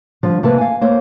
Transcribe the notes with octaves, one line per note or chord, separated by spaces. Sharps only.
D3 F3 G3
C3 E3 A#3 A4 B4 A5
F5 G#5
A#3 C5 C#5